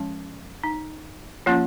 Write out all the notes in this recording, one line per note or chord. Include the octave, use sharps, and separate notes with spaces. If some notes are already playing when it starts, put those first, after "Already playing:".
Already playing: F3 G#3 C#4
D#4
F3 A#3 C#4 F4